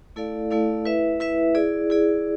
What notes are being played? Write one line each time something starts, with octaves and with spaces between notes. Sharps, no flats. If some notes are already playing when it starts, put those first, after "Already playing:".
A3 E4 A4 D5 F5
A3 E4 A4 D5 F5
E4 B4 E5
E4 B4 E5
E4 G#4 D5
E4 G#4 D5